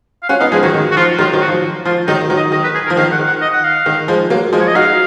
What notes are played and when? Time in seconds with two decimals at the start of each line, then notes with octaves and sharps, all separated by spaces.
0.23 F5
0.29 C#4 F4 F#5
0.40 B3 D#4 F5
0.52 F3 G#3 G#4
0.63 D#3 F#3 F#4
0.74 D#3
0.91 F#4
0.97 F3 F4
1.19 D#3 F#3 F4
1.33 D#3 F#3
1.41 F#4
1.48 F3
1.85 F3 F4
2.07 D#3 F#3 D#4
2.30 D#3 F#3
2.37 D#5
2.52 D#3 D#5
2.64 B4
2.75 G#4
2.86 A#4
2.90 F3
2.97 D#3 F5
3.12 F#5
3.19 D#3
3.27 F#5
3.41 D#5
3.53 F#5
3.64 F5
3.86 D#3
4.08 F3 G#3
4.30 F#3 A#3
4.53 F3 G#3
4.60 C#5
4.67 D#5
4.75 D#4 F#4 F5